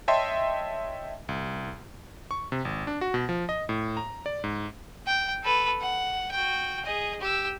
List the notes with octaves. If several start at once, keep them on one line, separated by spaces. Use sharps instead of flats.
C#5 D#5 E5 G5 A5 C6
C2
C#6
C3
G#1
D4
F#4
B2
F3
D#5
A2
A#5
D5
G#2
G5
A4 B4
F#5
F#4 G5
G#4 D#5
G4 E6